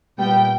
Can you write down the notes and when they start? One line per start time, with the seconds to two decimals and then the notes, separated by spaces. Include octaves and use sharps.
0.18 A#2 G3 B3 G5